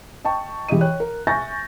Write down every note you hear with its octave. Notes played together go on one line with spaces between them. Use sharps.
D#5 G5 A5 C#6
E3 G4 G#4 D#5 D#7
C#5 G5 F#6
A#4
E5 G#5 C#6 G6 A6 A#6